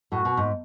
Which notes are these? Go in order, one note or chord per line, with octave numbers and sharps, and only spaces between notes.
A2 F#4
B2
G#2